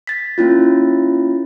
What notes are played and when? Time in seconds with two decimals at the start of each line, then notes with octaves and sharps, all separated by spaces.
0.07 A6 B6
0.38 A#3 C#4 E4 F4